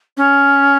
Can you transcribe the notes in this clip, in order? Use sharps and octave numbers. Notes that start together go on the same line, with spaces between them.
C#4